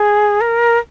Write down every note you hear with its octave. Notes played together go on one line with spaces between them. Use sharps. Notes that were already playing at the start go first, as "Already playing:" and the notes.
Already playing: G#4
A#4